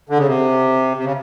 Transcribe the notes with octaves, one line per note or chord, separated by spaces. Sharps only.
D3
C#3
C3
C3
C#3